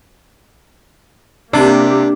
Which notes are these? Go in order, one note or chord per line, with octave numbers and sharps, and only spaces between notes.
C3 A#3 D4 G4